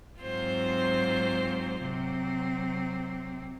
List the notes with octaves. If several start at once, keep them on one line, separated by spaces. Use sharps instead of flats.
G#2 F#3 C4 F4 C5
C3 F#3 C4